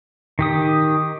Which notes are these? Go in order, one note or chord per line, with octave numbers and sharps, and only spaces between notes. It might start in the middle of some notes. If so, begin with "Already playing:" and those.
D#3 G4 D#6